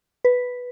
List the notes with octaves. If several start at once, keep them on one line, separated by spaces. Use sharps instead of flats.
B4